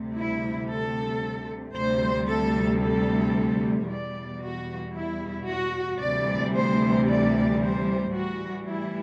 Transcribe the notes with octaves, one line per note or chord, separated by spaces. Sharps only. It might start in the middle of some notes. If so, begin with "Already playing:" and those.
Already playing: D2 C3 G3
E4
A4
D2 C3 G3 C5
A4
A4
E2 B2 G3 D5
F#4
E4
F#4
D2 C3 E3 G3 D5
C5
D5
C5
A2 E3 G3 F#4
E4